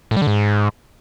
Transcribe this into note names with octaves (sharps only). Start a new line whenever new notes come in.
A2
G3
D3
G#2